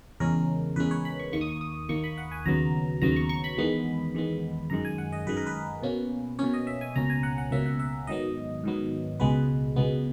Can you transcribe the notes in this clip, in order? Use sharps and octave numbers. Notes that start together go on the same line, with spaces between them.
E2 C#3 G#3 C#4 A#4
E2 C#3 G#3 C#4 B4
C#5
B5
C#6
D#2 D#3 A#3 C#6
D#6
C#6
D#6
D#2 D#3 A#3 C#6
B5
F#5
G#5
D#2 C#3 F#3 B3 A#5
D#2 C#3 F#3 B3 A#5
C#6
C#6
B5
E2 D#3 G#3 B3
E2 D#3 G#3 B3
F#2 D#3 G#3 A#5
G#5
F#5
D#5
F#2 D#3 G#3 B4
A#4
B4
B2 A#3 C#4
B2 A#3 C#4 C#5
D#5
E5
G#5
C#2 B2 A#3 C#4 A#5
G#5
F#5
F#5
C#2 B2 A#3 C#4 E5
F#5
E5
G#2 D#3 F#3 B3 D#5
G#2 D#3 F#3 B3
C#2 B2 G#3 B3 B4
C#2 B2 G#3 B3